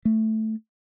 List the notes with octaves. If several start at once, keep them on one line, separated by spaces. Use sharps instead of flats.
A3